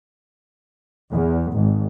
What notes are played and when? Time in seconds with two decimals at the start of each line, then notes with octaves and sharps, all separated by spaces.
1.12 E2
1.52 G#1